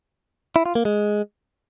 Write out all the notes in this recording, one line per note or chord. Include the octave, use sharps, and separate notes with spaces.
E4
F4
A#3
G#3